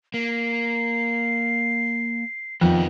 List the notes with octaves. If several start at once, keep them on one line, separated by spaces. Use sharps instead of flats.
A#3 C7
F2 D#3 B3